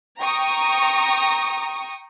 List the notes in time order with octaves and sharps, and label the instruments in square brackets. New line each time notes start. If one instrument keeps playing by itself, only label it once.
[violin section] G5 A#5 C#6 D#6